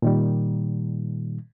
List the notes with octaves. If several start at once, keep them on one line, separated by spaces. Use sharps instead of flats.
A#2 D#3 G3